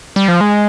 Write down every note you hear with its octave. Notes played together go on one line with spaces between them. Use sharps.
G3
F3
G#3